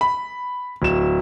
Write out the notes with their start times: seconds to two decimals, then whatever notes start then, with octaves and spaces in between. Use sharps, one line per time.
0.01 B5
0.82 D1 E7